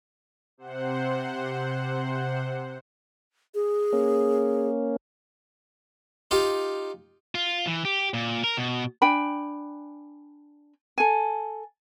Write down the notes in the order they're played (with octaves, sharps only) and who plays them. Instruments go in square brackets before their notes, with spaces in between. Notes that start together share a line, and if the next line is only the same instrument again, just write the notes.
[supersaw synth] C3 C5 F#5
[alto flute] G#4
[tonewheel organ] A#3 C#4
[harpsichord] D#4 F4 G4
[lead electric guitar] F4
E3
G4
A#2
A#4
B2
[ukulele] D4 G5 G#5 B5
A4 G#5